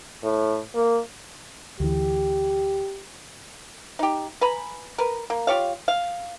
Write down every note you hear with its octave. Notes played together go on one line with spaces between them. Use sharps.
A2
A#3
D2 E3 G4
D#4 G4
B4 G#5 A#5 B5
A#4 B4
A#3
F4 G4 C#5 F5
F5